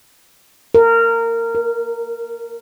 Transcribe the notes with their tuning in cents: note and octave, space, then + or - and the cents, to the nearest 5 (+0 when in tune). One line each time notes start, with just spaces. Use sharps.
A#4 -20
A#4 +15